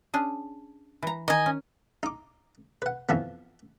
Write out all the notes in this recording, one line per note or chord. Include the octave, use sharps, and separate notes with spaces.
C#4 D4 G#4
E3 A#5
D#3 D#5 G#5
C#4
D#4 D6
B4 F#5
F2 E3 F3 B3